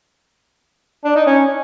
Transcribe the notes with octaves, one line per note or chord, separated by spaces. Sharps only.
D4
D#4
C#4